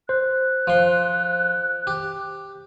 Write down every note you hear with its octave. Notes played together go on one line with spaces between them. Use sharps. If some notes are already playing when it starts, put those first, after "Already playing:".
C5 F#6
F3 C6
G4